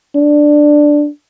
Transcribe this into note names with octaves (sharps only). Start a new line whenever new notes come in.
D4